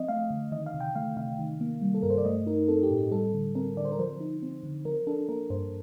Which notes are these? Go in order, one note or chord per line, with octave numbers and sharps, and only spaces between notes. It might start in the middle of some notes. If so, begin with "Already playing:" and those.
Already playing: F3 C4 D#5
A3 F5
D3
D#3 D#5
F5
C3
G5
A3 F5
C3 F5
D#3
A#3
G3
A4
G2 A#4
C5
D5
A3 D#5
D#4 A#4
C4 A4
G4
A2
G4
G3 A4
D3
C4 A#4
D3 D5
C5
A#4
F3 C5
D#4
C4
D3
F3 A#4
D4 A4
A#3 A#4
G2 C5